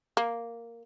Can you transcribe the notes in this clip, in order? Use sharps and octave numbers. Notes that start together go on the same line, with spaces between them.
A#3